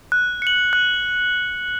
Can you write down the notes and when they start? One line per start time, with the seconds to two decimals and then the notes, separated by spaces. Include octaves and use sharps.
0.12 F#6
0.42 C#7 F#7
0.73 F#6